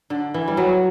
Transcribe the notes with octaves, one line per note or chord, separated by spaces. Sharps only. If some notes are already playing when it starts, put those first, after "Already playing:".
D3
E3
G3
F#3